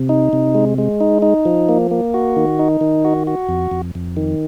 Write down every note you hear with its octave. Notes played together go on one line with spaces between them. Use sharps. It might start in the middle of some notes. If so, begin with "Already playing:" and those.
Already playing: C3
D#4
C3
G#3
G#3
D#4
D#4
F3
A#3
A#3
F#4
D#3
D#4
D#3
F#4
F#4
F2
F2
F2
D#3